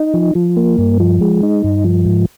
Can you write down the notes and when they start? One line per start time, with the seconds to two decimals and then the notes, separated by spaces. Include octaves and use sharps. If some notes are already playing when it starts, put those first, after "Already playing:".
Already playing: D#4
0.14 F3
0.35 F3
0.57 A#3
0.78 G2
1.00 F3
1.21 G#3
1.43 D#4
1.64 G2
1.84 F3
2.06 G#2